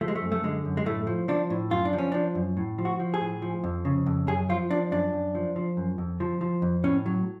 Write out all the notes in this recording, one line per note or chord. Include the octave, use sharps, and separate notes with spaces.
F3 A3
G#3
A3
F#2
A3
D3 G#3
F#2
G#3
A2 A3
F3
F3 D4
A2
F#2 F4
D4
F3
C#4
F3 D4
F#2
A2
F3
F#4
F3
G#4
A2
F3
F2
C#3
F2
F#2 G#4
F3 F4
F3 D4
F#2 D4
F#2
F3
F3
F#2
F2
F3
F3
F2
A2 C#4
F#3